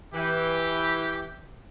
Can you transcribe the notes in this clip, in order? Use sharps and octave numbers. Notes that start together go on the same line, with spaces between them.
E3 G4